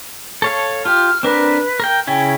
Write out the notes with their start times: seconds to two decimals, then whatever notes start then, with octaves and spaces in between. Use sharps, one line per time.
0.42 A4 C#5 F5
0.85 F4 G4 F6
1.23 C4 D4 A#4 B4
1.80 A#4 G5
2.07 C#3 C#4 E4 G5